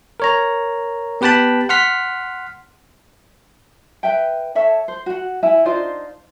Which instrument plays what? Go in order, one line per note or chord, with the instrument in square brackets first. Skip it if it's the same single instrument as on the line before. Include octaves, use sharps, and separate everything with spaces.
[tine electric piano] A#4 C#5 A#5
B3 G4 B4 G5 A5 B5
F#5 C6 F6 B6
[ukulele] B4 E5 G5
A4 C#5 E5 A5
C5
F#4 F#5
E4 E5 G#5
D4 D#4 F4 C5